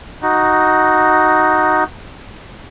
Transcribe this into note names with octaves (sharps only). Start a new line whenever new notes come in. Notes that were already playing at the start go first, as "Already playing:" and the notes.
D#4 F#4